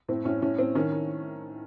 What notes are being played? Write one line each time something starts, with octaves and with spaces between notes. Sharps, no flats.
A2 C4
A2 C#4
A2 C#4
A2 C4
D#3 C#4
D#3